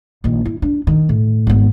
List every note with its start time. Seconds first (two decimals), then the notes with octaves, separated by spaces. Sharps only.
0.24 A#1 D#3
0.45 E4
0.62 D4
0.87 D#3
1.09 A2
1.47 G#1 B3